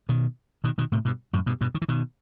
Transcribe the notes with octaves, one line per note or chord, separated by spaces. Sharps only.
B2 D#3
B2 D#3
B2 D#3
A2 C3
G2 B2
F#2 A2
G2 B2
G2 B2
D#3
E3
B2 D#3